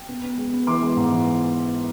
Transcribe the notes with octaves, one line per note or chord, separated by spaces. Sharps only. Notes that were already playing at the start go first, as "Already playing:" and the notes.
Already playing: G5
B3
B3
G#3
B3
E3 C6 D6
G#3
G#2
E3